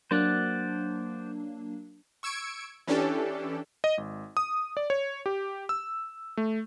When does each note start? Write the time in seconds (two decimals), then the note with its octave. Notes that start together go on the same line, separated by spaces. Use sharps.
0.11 F#3 A#3 D4 C5 D5 F#5
2.23 C#6 E6 G#6 C#7 D7
2.87 E3 C#4 D4 G4 A4
3.84 D#5
3.98 G#1
4.37 D#6
4.77 D5
4.90 C#5
5.26 G4
5.69 E6
6.37 A3